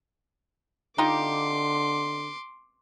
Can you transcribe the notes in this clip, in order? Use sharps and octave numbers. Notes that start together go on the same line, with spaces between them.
D3 D#4 F4 G4 C6 D6